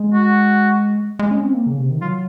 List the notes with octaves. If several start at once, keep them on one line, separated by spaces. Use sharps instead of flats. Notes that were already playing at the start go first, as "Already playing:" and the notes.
Already playing: G#3
F#4
G#3
C#4
C4
A#3
C#3
C3
D#3
F#3 F4